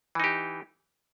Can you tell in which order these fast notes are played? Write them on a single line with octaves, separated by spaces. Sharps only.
E3 D#4 G4